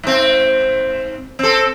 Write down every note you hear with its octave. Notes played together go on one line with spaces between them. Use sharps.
G#2 C4
C4 A4